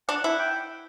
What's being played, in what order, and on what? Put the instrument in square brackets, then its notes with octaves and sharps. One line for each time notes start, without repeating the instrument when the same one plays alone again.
[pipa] D4 [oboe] F#5
[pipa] E4 [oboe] F#5
[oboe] G5